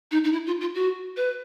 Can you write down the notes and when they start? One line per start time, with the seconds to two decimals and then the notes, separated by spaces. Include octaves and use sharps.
0.12 D#4
0.24 D#4
0.32 E4
0.47 F4
0.61 F4
0.75 F#4
1.17 B4